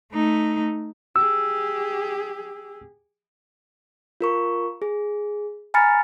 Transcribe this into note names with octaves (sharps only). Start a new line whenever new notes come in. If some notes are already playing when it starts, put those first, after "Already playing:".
A3 D#4
G4 G#4 E6
F4 A#4 C#6
G#4
G#5 A#5 B5 F6 A6 C#7